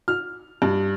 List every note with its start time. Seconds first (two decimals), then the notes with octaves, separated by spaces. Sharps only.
0.08 F6
0.62 G2